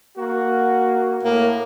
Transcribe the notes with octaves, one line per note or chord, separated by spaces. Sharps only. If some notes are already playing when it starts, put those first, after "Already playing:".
A#3 F#4
A2 A#3